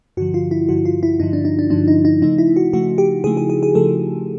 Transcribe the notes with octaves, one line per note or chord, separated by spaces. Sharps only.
G2 D3 F3 F#4
F4
E4
G2 D3 F3 F#4
F4
E4
G2 D3 F3 D#4
D4
D#4
D4
G2 D3 F3 D4
D#4
D#4
C#3 F3 A3 D#4
E4
F#4
C#3 F3 A3 F#4
G4
C#3 F3 A3 G#4
G#4
G#4
G#4
C#3 F3 A3 A4